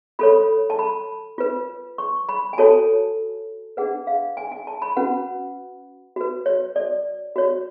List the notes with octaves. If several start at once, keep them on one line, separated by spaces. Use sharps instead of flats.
F4 A4 C#5 B5
A5
B5
F4 B4
C#6
B5
G#5
F#4 A4 C#5 A5
D4 G#4 B4 F#5
F5
G#5
G#5
A5
B5
C#4 F#4 B4 F#5
F#4 B4
C#5
D5
F#4 C#5